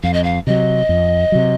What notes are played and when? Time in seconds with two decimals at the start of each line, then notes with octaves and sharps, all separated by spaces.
0.03 F2 F5
0.13 D#5
0.23 F5
0.46 C3 F#3 D#5
0.89 F2
1.32 C3 F#3